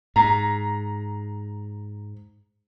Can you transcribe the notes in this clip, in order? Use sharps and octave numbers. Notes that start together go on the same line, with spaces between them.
G#2 A#5